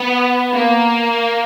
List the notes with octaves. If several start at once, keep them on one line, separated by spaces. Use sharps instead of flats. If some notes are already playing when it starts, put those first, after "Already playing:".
Already playing: B3
A#3